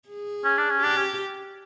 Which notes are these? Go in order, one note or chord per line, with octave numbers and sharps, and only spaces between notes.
G#4
C#4
D4
C#4
D4 G4
C#4